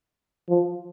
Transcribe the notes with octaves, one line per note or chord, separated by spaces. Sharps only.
F3